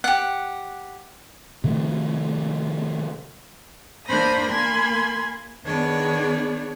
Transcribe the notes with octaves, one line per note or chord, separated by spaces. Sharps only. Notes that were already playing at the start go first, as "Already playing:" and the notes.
G4 F#5
C3 D#3 F3 A3
A#3 D4 C5 B5 D#6 A#6
A#3 G#5 B5 C6
D#3 B3 D4 G#4 C#5 D5